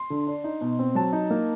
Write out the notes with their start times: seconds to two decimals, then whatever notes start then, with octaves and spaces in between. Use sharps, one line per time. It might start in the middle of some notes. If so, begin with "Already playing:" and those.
Already playing: C6
0.10 D3
0.27 D4
0.44 D#4
0.61 B2
0.79 C4
0.95 F#3 A5
1.13 D#4
1.31 A#3